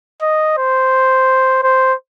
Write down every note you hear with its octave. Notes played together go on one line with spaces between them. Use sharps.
D#5
C5
C5